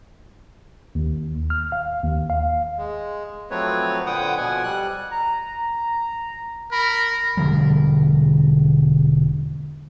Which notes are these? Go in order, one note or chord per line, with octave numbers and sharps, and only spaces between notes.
D#2
F6
F5
D#2
F5
G#3
F3 F#3 A3 C4 B4 C#5
A#2 D3 B4 F#5 G5 D#6
B2 F3 F#5 G#5
G3 F#6
A#5
A#4 B5
E1 D3 F3 G3